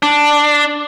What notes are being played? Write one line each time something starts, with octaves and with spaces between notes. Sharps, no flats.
D4